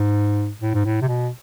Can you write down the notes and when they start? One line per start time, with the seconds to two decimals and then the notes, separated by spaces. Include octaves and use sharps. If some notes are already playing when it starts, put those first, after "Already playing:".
Already playing: G#2
0.62 A2
0.74 G#2
0.85 A2
1.02 C3
1.08 B2